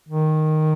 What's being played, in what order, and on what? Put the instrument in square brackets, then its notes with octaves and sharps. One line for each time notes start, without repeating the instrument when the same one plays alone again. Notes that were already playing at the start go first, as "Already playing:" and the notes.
[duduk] D#3